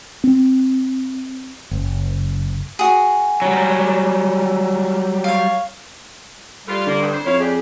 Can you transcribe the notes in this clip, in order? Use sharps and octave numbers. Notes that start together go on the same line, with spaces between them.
C4
F#1
F#4 G#4
F#3 G3
C#5 F5
E3 G3 A3 F4
D3 A#3
G2
F2 A2 C5
F2 E4 C#5 F5
E2 D4 G4 G#4